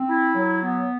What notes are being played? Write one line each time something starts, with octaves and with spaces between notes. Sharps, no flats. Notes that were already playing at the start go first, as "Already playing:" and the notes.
Already playing: C4
E4
F#3
B3